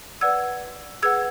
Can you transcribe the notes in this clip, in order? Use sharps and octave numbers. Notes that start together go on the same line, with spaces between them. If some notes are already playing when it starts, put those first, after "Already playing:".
B4 D5 F#5 E6 G#6
G#4 B4 F#5 E6 G#6